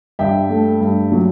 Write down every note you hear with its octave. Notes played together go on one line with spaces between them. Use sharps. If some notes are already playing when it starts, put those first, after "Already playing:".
G2 E5 G5
A3
G2
F#3